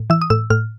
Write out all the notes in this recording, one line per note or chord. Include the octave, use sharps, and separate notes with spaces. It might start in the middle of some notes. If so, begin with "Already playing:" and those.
Already playing: A2
E3 E6
D#6
A2 E6
A2 F6